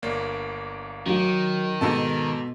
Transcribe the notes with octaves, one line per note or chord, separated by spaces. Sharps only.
G1 A#3 D5
D#3 F#3
G#2 B2 A4 A5